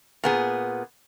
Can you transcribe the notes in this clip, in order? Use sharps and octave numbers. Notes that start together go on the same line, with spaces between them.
A#2 B3 G#4